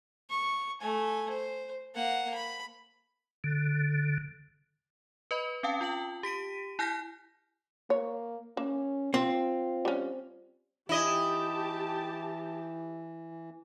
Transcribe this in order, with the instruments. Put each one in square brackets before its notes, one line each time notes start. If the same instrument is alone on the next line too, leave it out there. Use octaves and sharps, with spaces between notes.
[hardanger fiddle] C#6
A3 G#5
C5
A#3 F#5
B5
[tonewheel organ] D3
[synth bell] B4 D#5 B5
C4 C#4 F5 G5 A5
F4 G5 A5 F#7
G4 B6 D7 D#7
E4 G#5 F6 G6 A#6 B6
[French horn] A#3 [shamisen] C#5
[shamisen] A#3 [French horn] C#4
[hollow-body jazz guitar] C4 [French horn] F4
[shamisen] G3 C#4
[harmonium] E3 [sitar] E4 D#5 [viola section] G4 A5